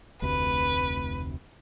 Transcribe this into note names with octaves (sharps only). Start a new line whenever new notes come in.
F1 D2 C3 B4